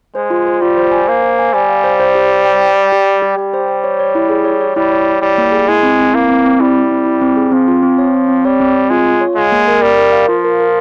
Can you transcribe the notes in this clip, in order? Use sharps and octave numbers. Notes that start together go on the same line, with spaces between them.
G#3 C5
F4
C5
G3 F4
C5
G#5
A#3 C5
C5
G#5
G3 G#5
F5
C5
C5
G4
C5
G5
G5
G5
G4
G5
G4
G3 G5
C5
C5
C#5
C#5
E4
G#4
C#5
C#5
G3 E4
C#5
C#5
G3 E4
A#3
G#4
G#3 E4
C4
C4
A#3 E4
C4
C4
G3 E4
E4
C4
E4
C4
G#4
F3 C4
F4
C4
C#5
C4
C4
G3 C#5
C4
C4
G#3 F4
F4
C#5
G#3 F5
A#3
A#4
G3 A#4
A#4
F5
F3 F4
A#4
A#4